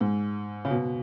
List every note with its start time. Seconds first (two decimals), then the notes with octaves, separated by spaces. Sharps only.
0.01 G#2
0.65 C#3
0.70 B2